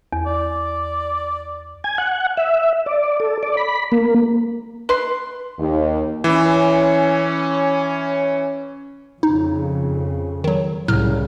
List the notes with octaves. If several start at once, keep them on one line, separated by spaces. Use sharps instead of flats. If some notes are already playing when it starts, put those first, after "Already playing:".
E2
D5
G#5
F#5
E5
D5
A4
D5
B5
A#3
B4 C6
D#2
E3 C#4
F2 C#3 D#4
D#3 F#3
C2 A2 C#3 F#3 F6